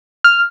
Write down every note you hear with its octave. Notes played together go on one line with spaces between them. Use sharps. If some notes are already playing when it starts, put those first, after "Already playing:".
F6